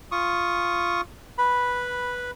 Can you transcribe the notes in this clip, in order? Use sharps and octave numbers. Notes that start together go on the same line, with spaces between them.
F4 C#6 D#6
B4 B5